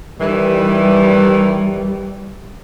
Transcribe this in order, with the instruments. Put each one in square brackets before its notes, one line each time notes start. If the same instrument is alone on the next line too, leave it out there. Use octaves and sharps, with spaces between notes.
[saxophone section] D#3 E3 [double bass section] G3